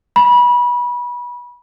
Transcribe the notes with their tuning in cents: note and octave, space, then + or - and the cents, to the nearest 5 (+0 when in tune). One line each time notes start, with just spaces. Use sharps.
B5 -25